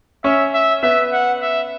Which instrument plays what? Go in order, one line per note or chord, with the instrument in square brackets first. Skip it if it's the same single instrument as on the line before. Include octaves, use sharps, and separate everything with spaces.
[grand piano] C#4 C#5 [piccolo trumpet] E5
[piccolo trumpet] E5
[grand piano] B3 B4 [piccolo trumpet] E5
[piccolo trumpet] F#5
E5